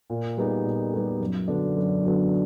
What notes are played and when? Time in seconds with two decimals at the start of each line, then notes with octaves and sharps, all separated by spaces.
0.10 A#2
0.37 G3 B3 D#4 G#4
0.65 A#2
0.93 G3 B3 D#4 G#4
1.20 F#2
1.48 D3 F#3 B3 D4
1.76 F#2
2.03 D3 F#3 B3 D4